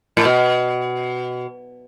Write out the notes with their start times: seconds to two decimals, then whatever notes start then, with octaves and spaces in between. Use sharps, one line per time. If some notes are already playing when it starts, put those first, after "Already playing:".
0.17 A2
0.25 B2